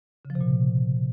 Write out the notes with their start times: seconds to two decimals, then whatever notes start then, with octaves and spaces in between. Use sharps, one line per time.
0.25 C#3
0.30 F3
0.35 C3
0.41 A#2